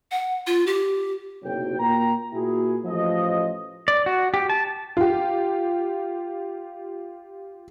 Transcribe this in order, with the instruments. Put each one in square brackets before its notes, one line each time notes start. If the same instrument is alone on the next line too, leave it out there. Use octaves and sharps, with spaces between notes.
[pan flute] F#5
F4
G4
[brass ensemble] F#1 B1 C3 F#3 G5
A#2 A#3 G5 A#5
A#2 A#3 E4 F#4 G#4
A1 F3 D#5
[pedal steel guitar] D5
F#4
G4
A5
[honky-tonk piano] F4 G4